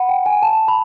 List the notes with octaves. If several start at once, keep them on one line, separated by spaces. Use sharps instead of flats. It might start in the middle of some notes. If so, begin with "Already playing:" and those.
Already playing: F#5 B5
G5
G#5
A5
B5